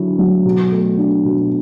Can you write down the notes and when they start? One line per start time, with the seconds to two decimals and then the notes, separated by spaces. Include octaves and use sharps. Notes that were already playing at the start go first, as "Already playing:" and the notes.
Already playing: D3 F#3 E4
0.19 F#3
0.45 B2
0.72 A3
0.98 D4
1.25 B2